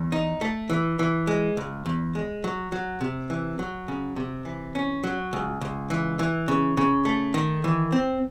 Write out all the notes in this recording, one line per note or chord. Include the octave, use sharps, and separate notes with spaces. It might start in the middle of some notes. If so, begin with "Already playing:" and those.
Already playing: E2
D#4
A3
E3
E3
G#3
C#2
E2
G#3
F#3
F#3
C3
E3
F#3
C#3
C3
E3
C#4
F#3
C#2
C#2
E3
E3
C#3
C#3
A3
D#3
E3
C4